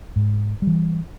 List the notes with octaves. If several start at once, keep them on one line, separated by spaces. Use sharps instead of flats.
G#2
G3
E3